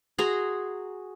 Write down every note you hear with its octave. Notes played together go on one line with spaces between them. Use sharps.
F#4 G#4 A#5 C6